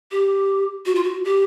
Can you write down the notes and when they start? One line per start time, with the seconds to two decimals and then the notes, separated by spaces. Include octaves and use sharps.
0.11 G4
0.86 F#4
0.95 F4
1.04 F#4
1.25 G4